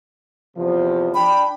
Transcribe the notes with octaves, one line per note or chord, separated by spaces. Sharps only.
E2 C3 F3
D4 G5 B5